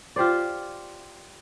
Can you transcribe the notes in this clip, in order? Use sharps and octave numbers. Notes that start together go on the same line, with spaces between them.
F4 G4 C5 D5